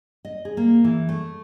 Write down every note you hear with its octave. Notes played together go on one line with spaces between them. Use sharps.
D#5
G#4
A#3
E3
A3